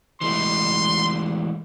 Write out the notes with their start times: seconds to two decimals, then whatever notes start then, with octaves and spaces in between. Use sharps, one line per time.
0.21 E3 G#3 A3 C6